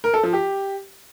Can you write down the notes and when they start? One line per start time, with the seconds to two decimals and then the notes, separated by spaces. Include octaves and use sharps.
0.04 A#4
0.14 A4
0.23 F3
0.33 G4